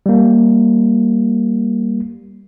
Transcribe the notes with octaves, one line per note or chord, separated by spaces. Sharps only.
G3 A#3